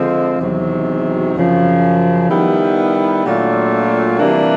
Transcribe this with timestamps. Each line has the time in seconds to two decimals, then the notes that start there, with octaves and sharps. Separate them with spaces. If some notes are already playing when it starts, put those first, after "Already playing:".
Already playing: D3 F3 G#3 C4
0.39 E2 C3 D#3 F#3
1.34 F#2 C#3 F3
2.29 D#3 G3 B3 E4 G4
3.25 A#2 F#3 A3 D4 F4
4.19 C3 E3 G3 A#3 D4